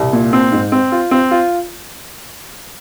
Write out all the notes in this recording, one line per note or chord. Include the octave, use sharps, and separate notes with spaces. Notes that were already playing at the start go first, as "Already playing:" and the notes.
Already playing: C2
A#2
C4
G#2
C4
F4
C4
F4